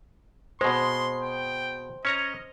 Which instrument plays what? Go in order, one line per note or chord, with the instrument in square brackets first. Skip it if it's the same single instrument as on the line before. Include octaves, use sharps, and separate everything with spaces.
[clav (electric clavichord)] B2 G#3 [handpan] C5 [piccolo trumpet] C6
[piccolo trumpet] G5
[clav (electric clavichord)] C#4 C#5 A#5 [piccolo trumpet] D#5